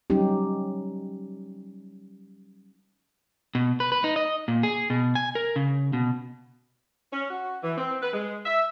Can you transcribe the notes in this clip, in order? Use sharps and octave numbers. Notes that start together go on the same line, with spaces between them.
F#3 G3 C#4 D#4 G4
B2
B4
B4
D#4
D#5
A#2
G#4
B2
G#5
A#4
C#3
B2
C#4
F#4
E3
C4
B4
G#3
E5